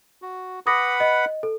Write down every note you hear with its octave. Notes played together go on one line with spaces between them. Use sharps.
F#4
B4 F#5 B5 D6 D#6 A#6
D#5
A4